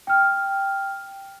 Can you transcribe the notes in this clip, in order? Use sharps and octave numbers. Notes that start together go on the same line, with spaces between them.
G5 F6